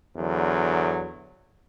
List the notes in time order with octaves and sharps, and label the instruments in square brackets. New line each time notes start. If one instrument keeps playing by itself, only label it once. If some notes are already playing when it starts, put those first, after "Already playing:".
[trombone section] E2 D3 F#3